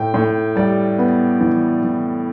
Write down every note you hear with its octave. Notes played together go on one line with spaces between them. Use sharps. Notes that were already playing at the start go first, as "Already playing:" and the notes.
Already playing: A2 G5
A2
G3 D5
B3
E3 D5
E3